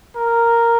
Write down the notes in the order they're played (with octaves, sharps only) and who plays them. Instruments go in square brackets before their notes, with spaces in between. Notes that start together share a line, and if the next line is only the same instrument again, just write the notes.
[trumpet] A#4